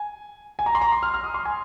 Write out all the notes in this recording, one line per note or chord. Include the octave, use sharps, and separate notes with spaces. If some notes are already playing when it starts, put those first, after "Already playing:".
Already playing: G#5
G#5
A#5
C6
A#5
C6
F6
F6
D#6
C6
G#5